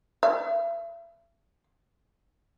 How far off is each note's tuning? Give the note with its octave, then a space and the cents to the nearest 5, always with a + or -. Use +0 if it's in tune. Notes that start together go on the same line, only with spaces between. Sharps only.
E5 +40